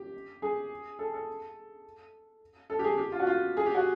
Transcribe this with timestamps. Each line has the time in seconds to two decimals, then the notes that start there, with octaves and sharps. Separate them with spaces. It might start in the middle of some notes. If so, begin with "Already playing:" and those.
Already playing: G4
0.42 G#4
0.99 A4
1.14 A4
2.70 A4
2.79 G4
2.84 G#4
2.98 G4
3.12 F4
3.20 F#4
3.27 F4
3.57 G#4
3.66 G4
3.75 F#4